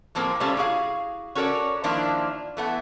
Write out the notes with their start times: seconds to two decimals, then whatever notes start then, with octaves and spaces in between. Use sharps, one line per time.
0.15 A2 F3 A#3 C4 G#4
0.40 C3 G3 A3 C4 C#4 F4
0.57 E4 F#4 G#4 F5
1.35 C#4 F#4 A4 A#4 C#5 D5
1.84 D#3 F3 A#3 D4 E4 F4
2.57 E3 A3 B3